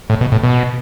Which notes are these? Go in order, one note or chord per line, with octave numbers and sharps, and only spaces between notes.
A2
B2
A2
B2